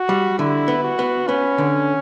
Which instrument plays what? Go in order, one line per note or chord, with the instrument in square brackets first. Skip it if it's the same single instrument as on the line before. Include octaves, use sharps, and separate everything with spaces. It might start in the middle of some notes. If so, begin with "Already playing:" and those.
Already playing: [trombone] F#4
[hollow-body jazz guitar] G3
[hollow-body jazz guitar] D3 [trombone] E4
[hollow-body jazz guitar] B3
[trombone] F#4
[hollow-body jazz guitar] B3
[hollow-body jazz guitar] B3 [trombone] C#4
[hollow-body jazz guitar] D3